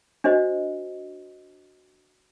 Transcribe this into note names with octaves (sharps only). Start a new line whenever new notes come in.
D4 F#4 C5 D#5